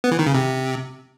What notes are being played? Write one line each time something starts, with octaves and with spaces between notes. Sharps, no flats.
B3
E3
D#3
C#3
C3